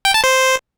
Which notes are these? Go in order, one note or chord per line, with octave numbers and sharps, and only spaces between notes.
G5
A5
C5